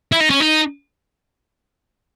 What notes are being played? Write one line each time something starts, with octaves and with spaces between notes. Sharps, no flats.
E4
D#4
C#4
D#4